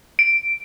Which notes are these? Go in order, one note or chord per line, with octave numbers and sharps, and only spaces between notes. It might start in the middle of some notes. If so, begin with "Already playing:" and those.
D7